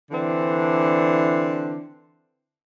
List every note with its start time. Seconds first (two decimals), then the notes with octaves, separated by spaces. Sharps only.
0.11 D3 E3 C4 D4